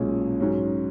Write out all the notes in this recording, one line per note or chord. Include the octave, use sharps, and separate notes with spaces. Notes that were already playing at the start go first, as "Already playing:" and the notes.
Already playing: B1 A#2 G#3 C#4
G#2 F#3 C#4